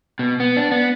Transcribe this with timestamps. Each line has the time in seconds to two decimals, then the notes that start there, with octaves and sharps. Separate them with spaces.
0.19 B2
0.40 B3
0.57 D4
0.71 B3